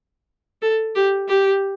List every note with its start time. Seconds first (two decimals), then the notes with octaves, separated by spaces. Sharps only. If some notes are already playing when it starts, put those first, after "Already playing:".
0.62 A4
0.95 G4
1.28 G4